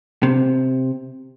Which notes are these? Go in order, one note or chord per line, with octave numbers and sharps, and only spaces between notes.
C3